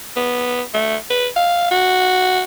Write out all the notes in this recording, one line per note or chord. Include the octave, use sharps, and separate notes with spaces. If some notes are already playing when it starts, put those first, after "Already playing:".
B3
A3
B4
F5
F#4